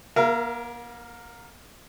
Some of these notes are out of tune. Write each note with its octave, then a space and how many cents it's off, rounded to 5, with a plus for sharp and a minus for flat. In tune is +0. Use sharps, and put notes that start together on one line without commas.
A#3 +40 A#4 +0 F5 -45